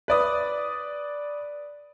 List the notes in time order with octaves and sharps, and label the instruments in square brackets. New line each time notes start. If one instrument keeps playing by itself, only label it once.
[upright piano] B4 D5 D#6